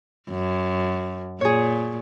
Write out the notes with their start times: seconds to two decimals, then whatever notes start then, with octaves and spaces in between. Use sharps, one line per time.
0.30 F#2
1.41 A#2 G#4 C#5